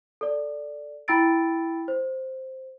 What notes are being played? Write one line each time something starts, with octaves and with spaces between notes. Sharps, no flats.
A4 D5
E4 G5 B5 E6 A6 D7
C5